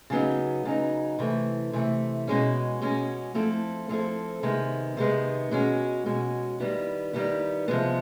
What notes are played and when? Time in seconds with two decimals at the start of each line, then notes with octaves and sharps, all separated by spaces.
0.10 C#3 F#3 B3 D#4
0.65 C#3 F#3 B3 D#4
1.19 C3 E3 A3
1.73 C3 E3 A3
2.27 B2 G#3 C#4
2.82 B2 G#3 C#4
3.35 F3 A3 C4 E4 A4
3.89 F3 A3 C4 E4 A4
4.43 C3 D#3 G#3 B3
4.97 C3 D#3 G#3 B3
5.51 B2 G#3 C#4 F#4
6.06 B2 G#3 C#4 F#4
6.59 D#3 G3 B3 E4
7.13 D#3 G3 B3 E4
7.68 C3 F3 G#3 B3